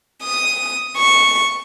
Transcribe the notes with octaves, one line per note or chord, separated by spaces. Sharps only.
D#6
C#6